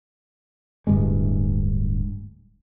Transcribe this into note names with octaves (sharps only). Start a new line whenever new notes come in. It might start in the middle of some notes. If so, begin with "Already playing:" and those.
D1 D2 G2 G#3